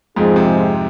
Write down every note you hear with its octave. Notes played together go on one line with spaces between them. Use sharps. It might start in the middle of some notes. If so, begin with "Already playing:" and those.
F2 G#2 F3 G#3 C4 F4 G#4
C3